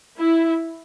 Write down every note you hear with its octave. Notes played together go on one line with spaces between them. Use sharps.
E4